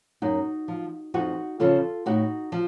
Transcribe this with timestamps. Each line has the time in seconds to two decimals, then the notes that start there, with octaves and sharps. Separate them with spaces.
0.22 F#2 D#4 F#4
0.68 F3
1.14 F2 D#4 F#4
1.60 C#3 F3 F4 A4
2.06 A2 D#4 F#4
2.52 F3